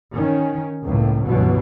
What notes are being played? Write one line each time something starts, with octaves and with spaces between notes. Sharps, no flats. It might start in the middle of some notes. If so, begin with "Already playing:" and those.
D#3 C#4
C#2 A2 A#3
C#2 G2 B2 D3 E3 F#3